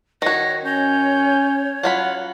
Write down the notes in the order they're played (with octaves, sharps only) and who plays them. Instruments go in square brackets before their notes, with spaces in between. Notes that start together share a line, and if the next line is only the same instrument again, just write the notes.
[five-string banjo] D#3 F#4 [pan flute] C#5 [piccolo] A#6
[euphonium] C#4 [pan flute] C#5 [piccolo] G6
[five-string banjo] F#3 F4 B5 [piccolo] F#5